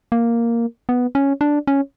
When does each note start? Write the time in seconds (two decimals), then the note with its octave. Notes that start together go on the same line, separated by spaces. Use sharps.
0.12 A#3
0.89 B3
1.15 C#4
1.41 D4
1.67 C#4